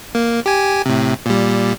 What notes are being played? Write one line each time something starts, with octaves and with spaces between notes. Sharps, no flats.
A#3
G4 G#5
A2 C3
A#2 G3